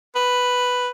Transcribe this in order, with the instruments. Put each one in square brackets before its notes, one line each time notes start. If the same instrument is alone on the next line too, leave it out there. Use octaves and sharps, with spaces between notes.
[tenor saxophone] B4